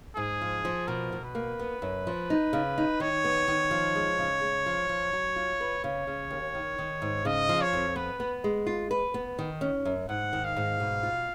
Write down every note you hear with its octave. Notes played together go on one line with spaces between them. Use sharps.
G#2 G#4
F3
F3
B2 A#4
B2
B4
A#3
B3
F#2
F3
D#4
C#3
D#4
D#3 C#5
B3
D#3
F3
G#3
C#3
G#3
F3
F3
F#3
F4
B4
C#3 C#5
C#3
D#2
D#3
D#3
G#2
C#3 D#5
F3
C#5
F2
B3 B4
B3
G#3
F4
B4
B3
D#3
C#4
F#2
G#2 F#5
D#3
F5
G#2
B2
F4